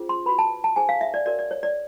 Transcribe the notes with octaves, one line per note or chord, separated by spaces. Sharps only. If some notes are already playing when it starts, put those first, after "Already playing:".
Already playing: C#4 F4 G#4 C5
C6
F#4 B4 B5
A5
A5
D#4 G#4 C5 G#5
F5
E5
D5
F#4 A#4 C#5 D5
D5
C#5
D5